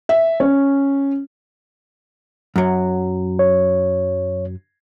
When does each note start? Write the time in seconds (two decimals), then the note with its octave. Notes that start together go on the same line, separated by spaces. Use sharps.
0.09 E5
0.40 C#4
2.56 F#2 F#3
3.39 C#5